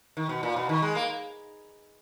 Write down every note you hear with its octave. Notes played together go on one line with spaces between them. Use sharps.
D#3
B2
A#2
B2
D#3
G#3
A#3